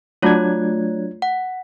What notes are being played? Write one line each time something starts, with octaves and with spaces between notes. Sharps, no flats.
F#3 A3 D4 F4 C#5 G#6
F#5